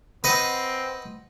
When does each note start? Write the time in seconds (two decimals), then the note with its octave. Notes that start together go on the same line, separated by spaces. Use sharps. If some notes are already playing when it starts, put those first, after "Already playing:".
0.24 C4 B4 D#5 F#5